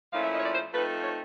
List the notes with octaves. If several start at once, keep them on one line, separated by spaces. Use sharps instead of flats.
A#2 F3 A3 C#4 E4 F5
E5
D#5
C#5
D5
C5
F3 A3 C4 D#4 B4
C#5